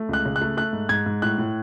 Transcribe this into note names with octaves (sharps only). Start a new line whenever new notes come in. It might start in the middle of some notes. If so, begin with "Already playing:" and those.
Already playing: A3
C#2 F#6
C#3
F#6
A3
A3 F#6
G#2
G#2 G#6
G#2
A2 F#6
A2